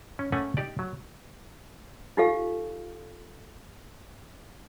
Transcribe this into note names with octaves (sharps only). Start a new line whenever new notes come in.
C#4
A3 A#3 C#4 F#5 G#5
D#4 G4 D5
F#3
D#4 F4 G4 A4 F5